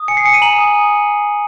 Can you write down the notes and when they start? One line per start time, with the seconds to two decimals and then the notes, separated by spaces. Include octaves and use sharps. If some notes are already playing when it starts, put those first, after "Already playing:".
Already playing: D#6
0.08 G#5 C#7
0.17 C7
0.25 G#5 C#7
0.34 D#7
0.42 A#5 F#7
0.58 D#6